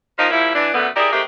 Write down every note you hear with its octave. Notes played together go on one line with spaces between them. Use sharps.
F3 A#3 D#4
F3 G3 A#3 E4
E3 D4
F#2 B2 D3 A3 B3
D#4 E4 G4 G#4 A#4 D5
D#3 G#3 A3 C4 G4